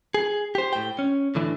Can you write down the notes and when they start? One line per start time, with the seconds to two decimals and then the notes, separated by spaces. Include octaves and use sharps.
0.14 G#4
0.55 G4 C5
0.73 A2 G5
0.99 C#4
1.35 A2 D3 E3